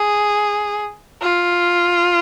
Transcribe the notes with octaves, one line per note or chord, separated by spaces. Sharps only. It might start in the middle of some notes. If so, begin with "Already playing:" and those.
Already playing: G#4
F4